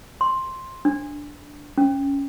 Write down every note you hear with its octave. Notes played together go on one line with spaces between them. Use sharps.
C6
D4
C#4